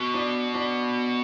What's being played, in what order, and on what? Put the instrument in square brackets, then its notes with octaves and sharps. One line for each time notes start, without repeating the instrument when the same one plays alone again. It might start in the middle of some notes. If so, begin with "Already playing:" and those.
Already playing: [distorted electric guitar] B2
[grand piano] D4
D4